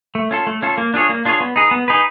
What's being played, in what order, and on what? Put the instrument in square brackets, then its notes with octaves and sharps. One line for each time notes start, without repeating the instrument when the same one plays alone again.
[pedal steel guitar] A3
C#4 F4 A4
A3
C#4 F4 A4
A#3
D4 F4 G#4 C#5
A#3
D4 F4 G#4 C#5
B3
D#4 G#4 B4
B3
D#4 G#4 B4